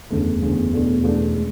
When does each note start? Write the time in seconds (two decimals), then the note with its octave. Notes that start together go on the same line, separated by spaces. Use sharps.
0.10 F#1 E2 D3 A3
0.42 F#1 E2 D3 A3
0.72 E2 B2 A3 D4
1.03 E2 B2 A3 D4
1.35 G#3